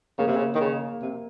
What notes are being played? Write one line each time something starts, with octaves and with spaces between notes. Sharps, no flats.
C#3 A#3
C3
C#3
D#3
C#3
C3